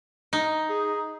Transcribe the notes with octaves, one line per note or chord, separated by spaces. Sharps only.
D#4
G#4